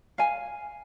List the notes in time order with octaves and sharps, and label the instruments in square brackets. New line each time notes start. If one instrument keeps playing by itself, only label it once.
[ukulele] F5 G#5